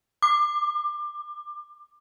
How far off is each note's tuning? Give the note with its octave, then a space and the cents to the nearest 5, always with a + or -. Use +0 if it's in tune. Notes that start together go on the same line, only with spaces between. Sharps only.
D6 +25